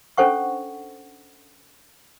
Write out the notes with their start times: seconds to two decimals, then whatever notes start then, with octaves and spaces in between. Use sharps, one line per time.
0.18 C#4 D4 A4 C5 F#5 C#6